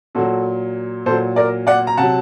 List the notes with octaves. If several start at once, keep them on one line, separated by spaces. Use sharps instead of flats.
A#2 F#3 F#4 A4
A#2 F#3 A4 C5
A#4 D5
D5 F#5
A#5
C3 F#3 F#5 A5